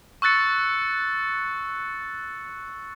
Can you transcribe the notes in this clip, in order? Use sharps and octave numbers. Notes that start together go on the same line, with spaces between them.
C#6 E6 F#6 A6 C#7